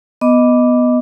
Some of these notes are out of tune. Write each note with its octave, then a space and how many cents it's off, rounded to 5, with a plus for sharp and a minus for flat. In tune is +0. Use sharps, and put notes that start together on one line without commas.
B3 +0 D#5 +0 D6 +0